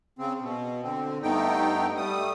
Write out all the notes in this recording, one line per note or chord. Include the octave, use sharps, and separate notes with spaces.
C#3 C4
B2
D3 C4
G2 A3 B3 D#4 G5
G3 A3 D#6